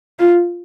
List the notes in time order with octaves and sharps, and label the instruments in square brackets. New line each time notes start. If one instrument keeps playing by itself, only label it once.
[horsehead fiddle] F4